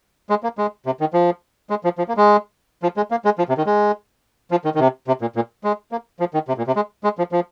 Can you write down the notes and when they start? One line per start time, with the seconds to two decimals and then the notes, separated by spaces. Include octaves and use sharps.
0.30 G#3
0.43 A#3
0.58 G#3
0.86 C3
1.00 D#3
1.13 F3
1.70 G#3
1.84 F3
1.98 F3
2.08 A#3
2.17 G#3
2.83 F3
2.97 G#3
3.11 A#3
3.25 G#3
3.38 F3
3.49 C3
3.58 D#3
3.66 G#3
4.51 F3
4.65 D#3
4.75 D#3
4.79 C3
5.07 C3
5.21 A#2
5.36 A#2
5.64 G#3
5.92 A#3
6.20 F3
6.34 D#3
6.48 C3
6.58 A#2
6.67 C3
6.76 G#3
7.04 G#3
7.18 F3
7.32 F3